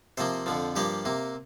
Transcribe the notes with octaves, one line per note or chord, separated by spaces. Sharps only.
C3 F3 A#3 C5
F2 D3 F3
G2 F3 A#3 G4
C3 A#3